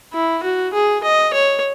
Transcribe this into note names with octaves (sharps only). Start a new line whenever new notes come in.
E4
F#4
G#4
D#5
C#5